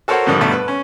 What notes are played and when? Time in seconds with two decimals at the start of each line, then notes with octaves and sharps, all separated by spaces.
0.08 F#4 A4 A#4 C5 C#5 F#5
0.26 F2 G#2 D3 D#3 G3
0.40 G2 B2 D3 G3 A3
0.52 B4
0.68 C#4